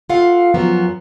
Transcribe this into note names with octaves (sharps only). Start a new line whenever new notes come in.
F4 A4 F5 F#5
F#2 F3 F#3 B3